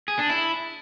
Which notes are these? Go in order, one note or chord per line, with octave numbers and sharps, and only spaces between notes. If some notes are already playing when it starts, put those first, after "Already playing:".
G#4
D4
E4